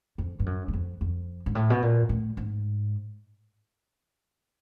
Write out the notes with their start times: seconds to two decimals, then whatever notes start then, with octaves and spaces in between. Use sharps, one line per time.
0.18 F2
0.39 G2
0.46 F#2
0.68 E2
0.73 F2
1.01 F2
1.46 G#2
1.55 A2
1.70 B2
1.82 A#2
2.09 A2
2.37 G#2